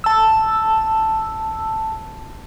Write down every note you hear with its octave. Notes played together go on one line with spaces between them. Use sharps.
A5 E6